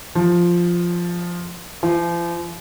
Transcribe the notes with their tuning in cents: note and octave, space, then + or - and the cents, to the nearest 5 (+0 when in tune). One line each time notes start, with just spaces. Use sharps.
F3 +0
F3 -40